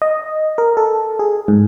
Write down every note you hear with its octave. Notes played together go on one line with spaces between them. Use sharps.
D#5
A#4
A4
G#4
G#2